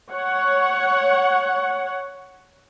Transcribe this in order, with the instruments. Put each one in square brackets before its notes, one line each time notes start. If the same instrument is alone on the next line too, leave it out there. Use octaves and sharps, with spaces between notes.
[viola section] C#5 F#5